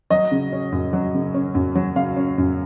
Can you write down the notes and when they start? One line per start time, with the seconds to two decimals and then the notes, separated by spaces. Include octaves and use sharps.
0.10 F#3 D#5
0.31 C#3
0.52 C#4
0.72 F#2
0.93 F#3
1.14 C#3
1.34 C#4
1.55 F#2
1.75 F#3
1.96 C#3 F5
2.17 C#4
2.38 F#2